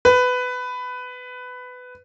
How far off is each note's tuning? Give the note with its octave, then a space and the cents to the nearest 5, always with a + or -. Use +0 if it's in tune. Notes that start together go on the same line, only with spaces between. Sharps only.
B4 +15